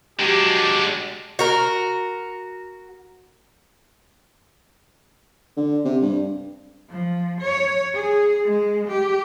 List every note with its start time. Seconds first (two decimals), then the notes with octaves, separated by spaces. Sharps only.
0.19 F#3 G#3 D4 F#4 G4
1.39 F#4 A#4
5.56 D3
5.85 C3
6.02 G2
6.90 F3
7.40 C#5
7.94 G#4
8.45 G#3
8.88 G4